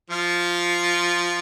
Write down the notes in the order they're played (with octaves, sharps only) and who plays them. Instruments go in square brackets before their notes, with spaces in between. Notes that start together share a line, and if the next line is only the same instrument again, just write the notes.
[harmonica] F3 F4